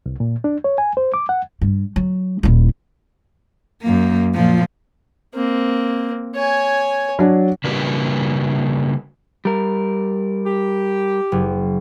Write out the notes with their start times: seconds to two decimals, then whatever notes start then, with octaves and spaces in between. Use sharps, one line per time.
0.06 C2
0.20 A#2
0.44 D4
0.64 C#5
0.78 G#5
0.97 C5
1.14 D6
1.29 F#5
1.61 G2
1.96 F#3
2.43 D#1 E4
3.82 F#2 A#3
4.34 A#2 F3
5.35 A#3 C4
6.35 C#5 G#5
7.19 F#3 D4
7.64 C#3 G3 A#3 D4 F#4 B4
9.45 G3 A#4
10.45 G4
11.32 F#1